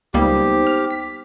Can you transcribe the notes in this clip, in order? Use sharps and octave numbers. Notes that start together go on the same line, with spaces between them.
C#2 G3 A#3 B3 D#4 G4 C5
F6
B6